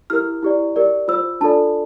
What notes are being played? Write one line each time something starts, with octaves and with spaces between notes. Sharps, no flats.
E4 G4 A#4 F6
E4 G4 D5
G4 A#4 D5
F4 C5 E6
D4 F4 A4 D5 A5